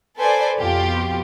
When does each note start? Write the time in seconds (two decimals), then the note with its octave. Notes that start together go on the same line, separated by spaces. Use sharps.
0.18 A4 B4 C5 D5 G#5
0.59 F2 B2 F4 G4